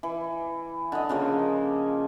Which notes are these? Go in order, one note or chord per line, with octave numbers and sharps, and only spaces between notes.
E3
D3 D#5
C#3 F3 A#3